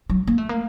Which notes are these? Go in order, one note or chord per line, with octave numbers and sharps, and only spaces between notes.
F#3
A#3
A3
A#3